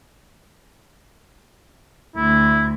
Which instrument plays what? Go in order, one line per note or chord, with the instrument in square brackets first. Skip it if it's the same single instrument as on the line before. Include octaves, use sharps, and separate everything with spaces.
[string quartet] D2 [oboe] E4